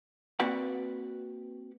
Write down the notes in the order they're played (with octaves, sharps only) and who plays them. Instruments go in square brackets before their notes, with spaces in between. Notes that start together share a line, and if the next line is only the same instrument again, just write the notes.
[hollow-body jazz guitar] A#3 C4 F#4 B4 D5 F#5